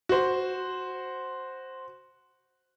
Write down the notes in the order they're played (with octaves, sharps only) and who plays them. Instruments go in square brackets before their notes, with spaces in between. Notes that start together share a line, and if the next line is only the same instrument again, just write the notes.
[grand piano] F#4 C5